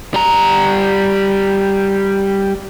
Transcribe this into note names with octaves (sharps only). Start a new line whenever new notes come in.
G3 A#5